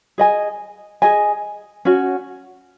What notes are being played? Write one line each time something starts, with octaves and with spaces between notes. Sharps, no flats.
G#4 D#5 G#5
G#4 D#5 G#5
C#4 F#4